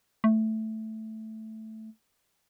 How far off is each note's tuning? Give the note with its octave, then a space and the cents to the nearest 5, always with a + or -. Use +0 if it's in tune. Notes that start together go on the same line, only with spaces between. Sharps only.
A3 +0